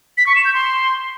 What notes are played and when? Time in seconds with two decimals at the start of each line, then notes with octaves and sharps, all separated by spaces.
0.18 B6
0.27 C#6
0.36 E7
0.45 G6
0.54 C6